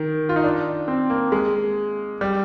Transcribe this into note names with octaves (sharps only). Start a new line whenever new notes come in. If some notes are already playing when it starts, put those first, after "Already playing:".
Already playing: D#3
F4
D#4
D4
C4
A#3
G#3
G3